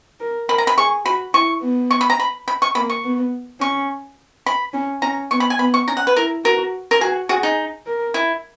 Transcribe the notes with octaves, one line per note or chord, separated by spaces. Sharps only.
A#4
A#4 B5
A#5
B5
G#4 C#6
F#4 B5
E4 C#6
B3
C#6
B5
A#5
B5
B5
C#6
A#3 B5
C#6
B3
C#4 C#6
B5
C#4
C#4 A#5
B3 C#6
B5
G#5
B3 B5
C#6
C#4 A#5
F#5
B4
E4 A#4
F#4 A#4
A#4
F#4 G#4
F#4 G#4
D#4
A#4
E4